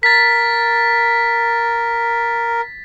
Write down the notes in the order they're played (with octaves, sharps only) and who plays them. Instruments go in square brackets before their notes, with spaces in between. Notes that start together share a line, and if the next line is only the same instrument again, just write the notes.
[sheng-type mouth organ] A#4 [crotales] A6 B6